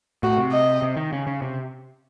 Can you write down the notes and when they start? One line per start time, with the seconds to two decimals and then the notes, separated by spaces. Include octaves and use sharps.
0.23 A2 F#4
0.38 C3
0.52 D#5
0.82 C3
0.97 D#3
1.13 C#3
1.27 C#3
1.42 C3